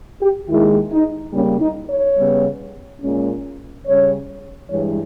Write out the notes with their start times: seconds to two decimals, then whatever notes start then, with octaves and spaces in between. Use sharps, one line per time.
0.21 G4
0.48 D#2 D#3 G#3 E4
0.91 D#4
1.33 C#3 G3 A#3 C#4
1.60 D#4
1.88 C#5
2.17 C#3 G3 B3
3.01 A#2 G#3 C#4
3.85 C#3 G3 C#4 C#5
4.70 G2 E3 G#3 C#5